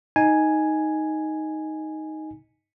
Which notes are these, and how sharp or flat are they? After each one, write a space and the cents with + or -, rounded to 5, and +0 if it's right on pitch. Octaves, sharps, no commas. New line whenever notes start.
D#4 +5 G#5 +0